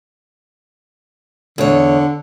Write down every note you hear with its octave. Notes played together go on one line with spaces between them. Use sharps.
E2 D3 C#5